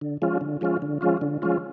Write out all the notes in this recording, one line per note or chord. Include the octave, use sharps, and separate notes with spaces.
D3
F3 G#3 C#4 F4
D3
F3 G#3 C#4 F4
D3
F3 G#3 C#4 F4
D3
F3 G#3 C#4 F4